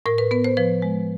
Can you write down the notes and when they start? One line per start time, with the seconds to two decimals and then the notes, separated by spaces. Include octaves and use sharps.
0.06 A2 A#4
0.18 B4
0.31 B3 B4
0.44 C5
0.57 F3 B4
0.82 G#3